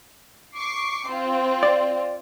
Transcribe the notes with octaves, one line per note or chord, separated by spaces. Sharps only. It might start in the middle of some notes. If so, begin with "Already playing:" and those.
C#6 D6 C7
C4 F4
D5